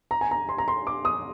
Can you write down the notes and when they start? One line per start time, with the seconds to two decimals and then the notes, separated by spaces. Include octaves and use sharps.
0.11 A#5
0.21 G#5
0.31 A#5
0.49 C6
0.58 A#5
0.68 C6
0.87 D6
1.05 D#6